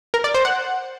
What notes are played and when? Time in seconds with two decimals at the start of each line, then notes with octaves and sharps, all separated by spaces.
0.14 A#4
0.24 D5
0.34 C5
0.45 F#5